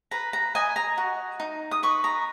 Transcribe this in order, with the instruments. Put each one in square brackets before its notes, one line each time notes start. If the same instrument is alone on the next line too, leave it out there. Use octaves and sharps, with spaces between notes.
[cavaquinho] B4 A#5
A#5
D#5 G#5
A#5
F#4
D#4
D#6
B4 C#6
A#5